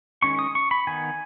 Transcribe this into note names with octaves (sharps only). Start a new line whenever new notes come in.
D#3 G#3 C#4 C#6
D#6
C#6
B5
D#3 B3 D#4 G#5